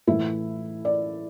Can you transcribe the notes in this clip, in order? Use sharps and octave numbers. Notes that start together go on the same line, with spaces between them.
A2 E3 E4
D5